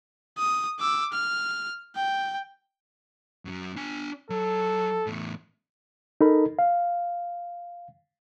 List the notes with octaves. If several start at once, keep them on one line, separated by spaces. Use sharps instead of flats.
D#6
D6 E6
F6
G5
F#2 F#3
D4 G#5
F#3 A4
E2 A2
D#4 A4 A#4 B5
F5